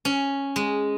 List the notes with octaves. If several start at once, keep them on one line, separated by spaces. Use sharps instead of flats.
C#4
G#3